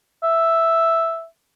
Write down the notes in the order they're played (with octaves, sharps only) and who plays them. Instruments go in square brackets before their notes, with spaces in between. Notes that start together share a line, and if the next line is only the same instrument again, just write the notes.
[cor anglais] E5